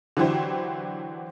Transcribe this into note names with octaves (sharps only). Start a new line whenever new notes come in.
D3 E3 F#3 E4 G4 C5